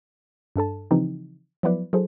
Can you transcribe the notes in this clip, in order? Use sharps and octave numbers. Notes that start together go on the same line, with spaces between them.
G2 D4 A4 A5
C#3 E3 F3 C4 D#4 G4
F3 F#3 B3 E4 B4 D5
F#3 E4 G#4 A4 C5